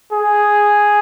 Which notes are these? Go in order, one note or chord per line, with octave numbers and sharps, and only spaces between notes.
G#4